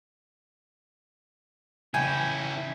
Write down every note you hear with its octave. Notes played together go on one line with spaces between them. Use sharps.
C#3 E3 C#4 E4 G5 G#5